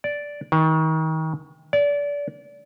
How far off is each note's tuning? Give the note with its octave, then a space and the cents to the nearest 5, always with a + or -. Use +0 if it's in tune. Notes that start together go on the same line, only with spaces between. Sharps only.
D5 -10
D#3 +35
D5 -30